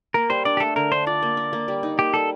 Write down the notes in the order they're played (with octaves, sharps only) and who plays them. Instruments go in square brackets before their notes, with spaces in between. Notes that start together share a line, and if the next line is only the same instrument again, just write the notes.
[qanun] A#3 [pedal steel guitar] A#4
[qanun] G3 [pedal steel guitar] C5
[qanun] D4 [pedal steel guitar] D5
[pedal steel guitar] G4
[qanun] A3 [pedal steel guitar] A4
[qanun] D3 [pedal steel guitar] A#4
[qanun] D4 [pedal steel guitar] C5
[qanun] F4 [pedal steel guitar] D5
[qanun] A#3
A#4
A#3
G3
D#4
[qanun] A#3 [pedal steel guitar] G4
[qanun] G3 [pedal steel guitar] A4